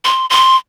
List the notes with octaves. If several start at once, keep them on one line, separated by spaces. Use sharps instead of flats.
C6
C6